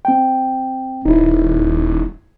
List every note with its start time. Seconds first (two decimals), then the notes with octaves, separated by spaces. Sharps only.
0.05 C4 G5
1.05 D#1 D#4 E4